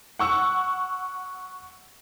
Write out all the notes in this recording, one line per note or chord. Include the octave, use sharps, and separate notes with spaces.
F#5 C#6 E6